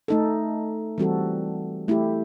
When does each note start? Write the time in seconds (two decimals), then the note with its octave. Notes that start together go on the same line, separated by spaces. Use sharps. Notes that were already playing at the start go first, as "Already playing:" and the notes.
0.08 A3 D#4 A4
0.98 E3 G3 C4 F#4 A4
1.88 A3 E4 G4